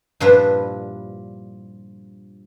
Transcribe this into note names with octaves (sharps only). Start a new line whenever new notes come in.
G2 A#2 F3 D4 E4 B4